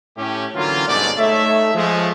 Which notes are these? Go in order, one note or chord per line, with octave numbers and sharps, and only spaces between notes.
A2 A3 C#4 G4
D3 E3 F#3 A#3 C#4 F4
G1 G#2 B2 A3 D5
A3 D#4 A4 C#5 E5
F3 G#3 A3